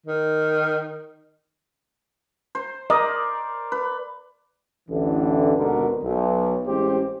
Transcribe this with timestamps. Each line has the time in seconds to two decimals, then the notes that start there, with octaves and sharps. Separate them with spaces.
0.06 D#3
2.55 C5
2.90 A#4 D5 D#5
3.72 B4
4.89 A1 D2 D3 E3
5.57 G#1 D#2 B2 D3 A#4
6.02 B1
6.66 A1 G#3 C4 G4 C5